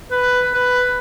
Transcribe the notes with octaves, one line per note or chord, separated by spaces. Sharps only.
B4
B4